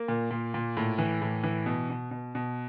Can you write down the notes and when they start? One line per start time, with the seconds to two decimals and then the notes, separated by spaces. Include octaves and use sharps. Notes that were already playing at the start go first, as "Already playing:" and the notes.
Already playing: A#3
0.08 A#2
0.31 A#2
0.54 A#2
0.77 A2
0.98 E3
1.22 A2
1.43 E3
1.66 B2
1.90 B2
2.11 B2
2.35 B2